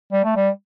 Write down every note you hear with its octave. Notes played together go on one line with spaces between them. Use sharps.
G3
A3
G3